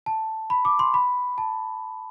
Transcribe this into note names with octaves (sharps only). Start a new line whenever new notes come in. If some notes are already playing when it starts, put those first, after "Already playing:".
A5
B5
D6
C6
B5
A5